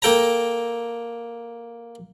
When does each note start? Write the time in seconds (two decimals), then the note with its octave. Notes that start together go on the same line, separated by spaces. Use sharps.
0.02 A#3 A4 G5 A5 A#5